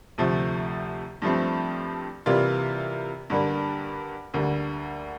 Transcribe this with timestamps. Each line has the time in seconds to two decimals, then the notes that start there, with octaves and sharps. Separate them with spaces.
0.18 D2 C3 F3 A3
1.22 G2 F3 A3 C4
2.26 C3 E3 G3 A#3 F4
3.30 G2 D3 G3 A#3
4.34 D2 D3 G3 A#3